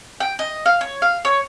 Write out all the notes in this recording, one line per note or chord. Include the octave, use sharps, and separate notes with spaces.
G5
D#5
F5
C#5
F5
C#5